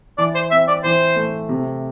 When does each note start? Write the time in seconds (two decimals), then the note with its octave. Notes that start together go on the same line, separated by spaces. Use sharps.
0.18 E3 D5
0.35 C5
0.51 C4 E5
0.68 D5
0.83 E3 C5
1.16 A3
1.49 C3